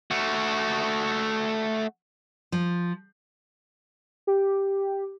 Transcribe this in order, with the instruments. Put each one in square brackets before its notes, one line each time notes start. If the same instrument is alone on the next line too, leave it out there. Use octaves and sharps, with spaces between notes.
[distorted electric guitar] A3 F#4
[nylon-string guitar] F3
[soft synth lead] G4